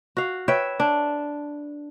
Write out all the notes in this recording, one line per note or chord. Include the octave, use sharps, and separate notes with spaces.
F#4 F5
B4 C#5 E5 G5
D4